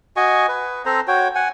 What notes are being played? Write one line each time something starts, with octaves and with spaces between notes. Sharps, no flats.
F#4 D#5 G#5 C#6
B4
C4 A4 C5 A#5
F#4 C#5 G5
F#5 G#5